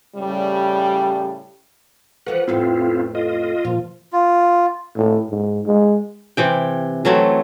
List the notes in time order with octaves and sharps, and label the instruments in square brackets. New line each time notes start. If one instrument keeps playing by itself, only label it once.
[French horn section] A2 C#3 G3
[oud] E3 F3 A3 [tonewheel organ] B4 F#5
[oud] F2 A2 B3 [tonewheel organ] C4 E4 F4
[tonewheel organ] F4 D#5
[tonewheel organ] A#2 F3 [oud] F4
[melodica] F4
[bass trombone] A2
G#2
G#3
[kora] C3 E3 G5
E3 F#3 A3 C4